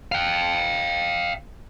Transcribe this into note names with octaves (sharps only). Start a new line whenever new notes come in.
F5 G5